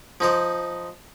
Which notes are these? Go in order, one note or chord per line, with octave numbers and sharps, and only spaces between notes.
F3 D#4 C5